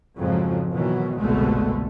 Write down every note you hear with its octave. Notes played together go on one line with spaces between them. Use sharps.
F2 G#2 C#3 F3 F#3
B2 D#3 E3 F#3
G1 C2 B2 D3 G#3 A3